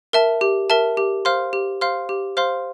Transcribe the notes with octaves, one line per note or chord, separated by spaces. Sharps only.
A#4 E5 A5
G4
A#4 E5 A5
G4
C5 F5 C6 F6
G4
C5 F5 C6 F6
G4
C5 F5 C6 F6